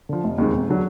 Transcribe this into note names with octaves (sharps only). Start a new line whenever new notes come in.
D3 F3
F1
D#2 D#3 G#3 C4
E1
D3 F#3